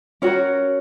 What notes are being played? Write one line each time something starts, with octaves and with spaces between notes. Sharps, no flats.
C#4 F#4 A#4 C#5